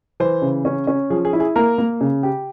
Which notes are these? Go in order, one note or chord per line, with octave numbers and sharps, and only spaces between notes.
E3 C5
C#3
C#4
C#4
F3 G#4
G#4
E4
G#4
A#3 A#4
A#3
C#3
G4